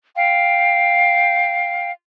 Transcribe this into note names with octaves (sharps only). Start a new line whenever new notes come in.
F5 G5